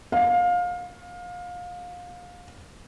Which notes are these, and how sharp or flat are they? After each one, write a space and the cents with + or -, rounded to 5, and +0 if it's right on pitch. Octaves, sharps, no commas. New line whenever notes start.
F5 +25